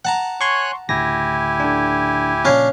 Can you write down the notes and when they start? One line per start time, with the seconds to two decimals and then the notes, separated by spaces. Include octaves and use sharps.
0.05 F#5 A5 A#5
0.41 C#5 G#5 C6 C#6 F#6
0.89 D2 A2 C#3 E4 G4 G#5 A#6
1.60 D3 D4
2.45 A#2 C#3 F3 C#4 D4 F5